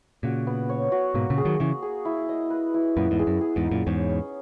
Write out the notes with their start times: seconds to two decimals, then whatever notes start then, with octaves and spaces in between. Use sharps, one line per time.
0.23 A#2 C#3 F#4
0.47 B3
0.69 C#5
0.92 F#4
1.14 G#2 B2 A#3
1.30 A#2 C#3
1.38 G#4
1.45 D#3 F#3
1.60 C#3 E3 G#4
1.82 G#4
2.05 E4
2.29 D#5
2.50 B4
2.74 E4
2.97 F#2 A#2 B3
3.11 E2 G#2
3.19 G#4
3.27 F#2
3.41 G#4
3.56 E2 G#2
3.64 D#4
3.71 F#2 A#2
3.87 E2 G#2 C#4
4.10 C#4